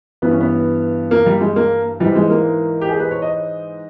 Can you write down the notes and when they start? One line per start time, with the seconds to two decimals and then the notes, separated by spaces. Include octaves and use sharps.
0.22 G2 E3 B3
0.31 C#4
0.40 B3
1.11 A#3
1.26 G3
1.41 G#3
1.56 A#3
2.00 G#2 E3 G3
2.15 G#3
2.30 A#3
2.81 G4
2.89 G#4
3.00 B4
3.11 C#5
3.22 D#5